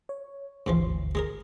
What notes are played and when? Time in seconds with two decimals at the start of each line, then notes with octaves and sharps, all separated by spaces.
0.09 C#5
0.66 G#1 D2 G#2 E3 F3 C6
0.86 G1 D2
1.15 G#3 G#4 A#4